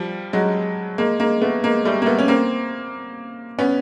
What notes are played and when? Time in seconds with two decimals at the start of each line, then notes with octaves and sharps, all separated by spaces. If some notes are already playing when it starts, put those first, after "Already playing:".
Already playing: F3 G3
0.33 F#3 G#3
0.98 G#3 A#3
1.20 G#3 A#3
1.42 A3 B3
1.63 G#3 A#3
1.85 G3 A3
2.02 A#3
2.06 A3 B3
2.19 C#4
2.28 A#3 C4
3.59 B3 C#4